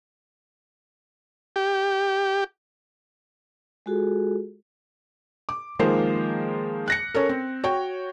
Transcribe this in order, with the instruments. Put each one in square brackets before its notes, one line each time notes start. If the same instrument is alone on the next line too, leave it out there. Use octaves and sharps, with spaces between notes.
[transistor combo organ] G4
[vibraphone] G#3 F4 F#4 G#4 A4
[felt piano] D6
D#3 F3 G#3 A#3 C5
F#6 A#6 C#7
C#4 A4 A#4
C4
F#4 C#5 G5